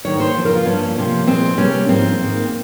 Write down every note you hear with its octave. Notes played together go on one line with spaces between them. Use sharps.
G#2 D#3 A#3 C#5
C5
F2 C#3 F3 A#3
A#4
F4
G2 F3 A#3 C#4
C3 F3 A#3
A#2 F3 G#3 C4
C3 G3 A#3 C#4
G#2 F3 A#3 C4
G#2 D#3 A#3